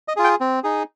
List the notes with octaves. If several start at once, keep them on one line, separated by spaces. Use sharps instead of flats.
D#5
F4 G#4
G5
C4
D#4 G#4